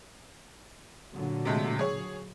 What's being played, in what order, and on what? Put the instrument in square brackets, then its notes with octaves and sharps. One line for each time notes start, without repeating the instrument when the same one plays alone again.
[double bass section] A#2 D3 F#3
[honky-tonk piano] C3 G#3 A3
G#4 C#5